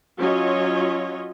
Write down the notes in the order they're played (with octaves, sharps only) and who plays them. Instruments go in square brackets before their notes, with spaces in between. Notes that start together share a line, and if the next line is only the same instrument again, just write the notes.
[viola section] F#3 C#4 F4 C#5 D#5